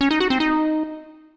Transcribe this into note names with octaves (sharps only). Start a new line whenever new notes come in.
C#4
D#4
F#4
C4
D#4